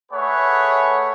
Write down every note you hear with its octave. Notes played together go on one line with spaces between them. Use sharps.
A3 G#4 B4 C#5 F#5